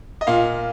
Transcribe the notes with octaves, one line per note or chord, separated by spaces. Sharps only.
D#5
A#2 F5